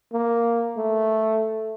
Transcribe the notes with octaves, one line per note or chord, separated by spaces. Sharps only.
A#3
A3